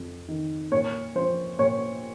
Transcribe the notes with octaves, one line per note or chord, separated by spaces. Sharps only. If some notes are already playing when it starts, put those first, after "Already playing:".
Already playing: F2
D#3
A#2 C#5
F3 C5
A#2 C#5